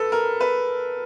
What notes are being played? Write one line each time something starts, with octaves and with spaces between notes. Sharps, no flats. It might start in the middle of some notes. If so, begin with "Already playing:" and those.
Already playing: A4 B4
A#4
B4